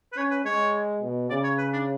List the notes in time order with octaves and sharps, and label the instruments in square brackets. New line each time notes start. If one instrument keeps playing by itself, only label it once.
[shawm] B4
[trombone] C#4 [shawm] C#5
[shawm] B4
[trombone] G#3 [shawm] C#5
[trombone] B2
[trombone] C#3 [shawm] D5
[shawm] C#5
B4
D4